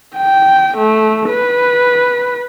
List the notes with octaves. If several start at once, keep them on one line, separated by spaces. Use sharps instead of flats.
G5
A3
B4